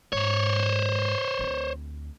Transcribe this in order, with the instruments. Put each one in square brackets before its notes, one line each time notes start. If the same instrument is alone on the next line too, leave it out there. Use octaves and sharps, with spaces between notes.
[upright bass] G#2 [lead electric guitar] C5 C#5
[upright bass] D2 C4